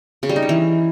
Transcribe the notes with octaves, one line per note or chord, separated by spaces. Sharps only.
C#3
G3
D#4
C#4
E3